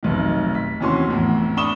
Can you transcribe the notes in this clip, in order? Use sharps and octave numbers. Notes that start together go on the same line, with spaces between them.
F1 B1 D#3
B6
D#2 C3 E3 C#4 F#4 C6
F1 E2 A2
D4 B5 C#6 D#6 E7 G7